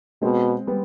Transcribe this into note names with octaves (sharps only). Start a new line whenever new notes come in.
B2 G#3 C4
G3 B3